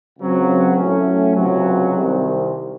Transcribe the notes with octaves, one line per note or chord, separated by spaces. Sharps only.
C#2 C#3 F#3 C4
A2 F#3 A3 C#4
C#2 C3 F#3
C2 C3 D#3